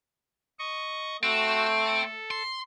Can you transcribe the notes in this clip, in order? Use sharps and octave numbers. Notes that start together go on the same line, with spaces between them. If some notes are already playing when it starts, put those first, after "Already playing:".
D#5 C#6
A3 C4 F#4 E6
A4
C6